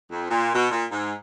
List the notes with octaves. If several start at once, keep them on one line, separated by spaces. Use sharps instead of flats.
F2
A#2
B2
A#2
G#2